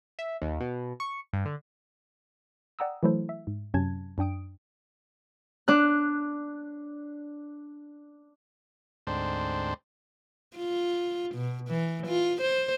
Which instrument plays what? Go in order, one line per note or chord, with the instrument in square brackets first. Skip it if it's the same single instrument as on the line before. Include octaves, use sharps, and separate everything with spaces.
[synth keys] E5
D#2
B2
C#6
G2
D3
[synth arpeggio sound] D5 F#5 G5 A#5 D#6 E6
E3 F#3 A3 E4 A4 C5
E5
G#2
F#2 C3 F#3 C#4 A5 G#6
F#2 D4 G5 D#6 D7
[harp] D4 F#6
[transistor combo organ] D2 G#2 C4 D4 C5
[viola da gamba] F4
B2
E3
F4
C5